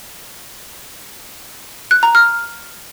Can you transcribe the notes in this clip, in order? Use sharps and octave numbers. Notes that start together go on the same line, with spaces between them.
F#6
A#5
F6